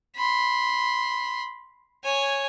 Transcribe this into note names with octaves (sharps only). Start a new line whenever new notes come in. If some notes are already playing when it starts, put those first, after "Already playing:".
B5 C6
C#5 G#5